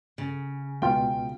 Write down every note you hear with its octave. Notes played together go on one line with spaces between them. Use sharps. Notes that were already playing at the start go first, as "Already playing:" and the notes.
C#3
C#2 B2 F4 G5